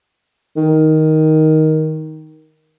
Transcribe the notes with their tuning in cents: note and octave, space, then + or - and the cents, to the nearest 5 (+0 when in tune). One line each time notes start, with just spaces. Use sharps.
D#3 +10